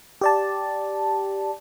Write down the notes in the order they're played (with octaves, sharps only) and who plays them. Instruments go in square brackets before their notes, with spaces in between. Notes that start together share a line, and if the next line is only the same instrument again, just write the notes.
[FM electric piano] G4 D5 A5